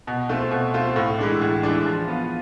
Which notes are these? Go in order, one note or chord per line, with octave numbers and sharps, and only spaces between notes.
B2
A3 C4 F4
B2
A3 C4 F4
A2
E3 G#3 D4
A2
E3 G#3 D4
F3
B3 F4